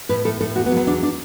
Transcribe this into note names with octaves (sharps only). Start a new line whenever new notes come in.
A2 B4
A2 A4
A2 A4
E2 F#4
B3
F#3
B3
E2 D4
D4